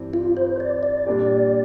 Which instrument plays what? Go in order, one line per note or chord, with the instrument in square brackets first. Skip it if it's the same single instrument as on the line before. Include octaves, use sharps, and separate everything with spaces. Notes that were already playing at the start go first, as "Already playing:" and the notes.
Already playing: [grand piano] G2 E3 G3 C4
[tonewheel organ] F4
C5
D5
D5
[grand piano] A#2 G3 D4 G4